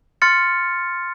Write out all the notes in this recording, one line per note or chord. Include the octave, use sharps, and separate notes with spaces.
C6 F6 A6 C#7